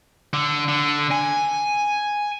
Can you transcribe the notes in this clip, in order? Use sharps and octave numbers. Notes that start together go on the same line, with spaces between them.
D3
D3
G#5